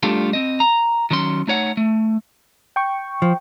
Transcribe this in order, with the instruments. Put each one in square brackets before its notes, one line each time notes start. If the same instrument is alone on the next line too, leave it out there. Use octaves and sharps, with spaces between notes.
[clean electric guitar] G3 A3 D4 F4 G4 A4
C4 D#5
A#5
D#3 F#3 C#4 C6
A3 D#4 C#5 F#5
A3
[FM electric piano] G5 C#6
[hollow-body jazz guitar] F3